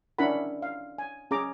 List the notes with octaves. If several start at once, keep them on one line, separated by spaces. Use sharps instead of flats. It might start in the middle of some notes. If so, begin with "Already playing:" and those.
C#4 D4 E4 A#4 F#5 B5
F5
G#5
C#4 G#4 A#5 D6